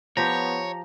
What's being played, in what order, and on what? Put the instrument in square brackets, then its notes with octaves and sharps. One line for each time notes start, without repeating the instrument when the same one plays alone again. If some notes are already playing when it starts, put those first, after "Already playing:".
[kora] F3 G4 [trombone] B3 [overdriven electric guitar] C#5 [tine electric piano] A#5